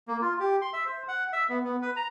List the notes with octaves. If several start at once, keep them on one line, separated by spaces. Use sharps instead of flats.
A#3
F4
G4
C6
E5
C5
F#5
E5
B3
B3
B4
A#5